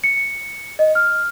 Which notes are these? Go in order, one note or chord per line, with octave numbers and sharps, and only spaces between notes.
C#7
D#5
F6